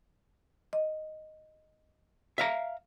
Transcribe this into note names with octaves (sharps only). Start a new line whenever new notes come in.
D#5
E5 F5 A#5